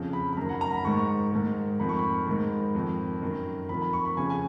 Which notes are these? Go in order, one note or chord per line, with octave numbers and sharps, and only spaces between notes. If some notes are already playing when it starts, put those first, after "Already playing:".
Already playing: F2 C#3
B5
B5
F#2 D#3 A#5
F#5
A#5
B5
G#2 D#3 C#6
G#2 D#3
F2 D#3 B5
C#6
B5
G#2 D#3
F2 D#3
F#2 D#3
F2 D#3 B5
B5
C#6
B5
F2 C#3 G#5
G#5